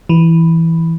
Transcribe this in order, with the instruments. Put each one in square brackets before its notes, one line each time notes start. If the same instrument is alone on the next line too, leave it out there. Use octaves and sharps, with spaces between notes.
[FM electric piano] E3